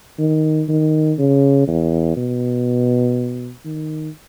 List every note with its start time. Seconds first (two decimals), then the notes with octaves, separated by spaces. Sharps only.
0.19 D#3
0.69 D#3
1.18 C#3
1.67 E2
2.17 B2
3.65 D#3